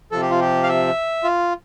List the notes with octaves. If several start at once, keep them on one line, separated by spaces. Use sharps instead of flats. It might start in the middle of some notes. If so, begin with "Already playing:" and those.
C3 F3 A4
G4
F4
G4
F5
E5
F4